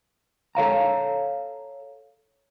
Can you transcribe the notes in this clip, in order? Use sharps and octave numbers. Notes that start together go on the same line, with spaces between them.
A4 C#5 F5 A#5